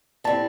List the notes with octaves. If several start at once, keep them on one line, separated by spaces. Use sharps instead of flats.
A2 G3 C4 A5